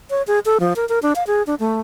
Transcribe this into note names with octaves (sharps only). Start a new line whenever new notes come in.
C#5
G#4
A4
F3
A#4
A#4
D4
F5
G#4
D4
A3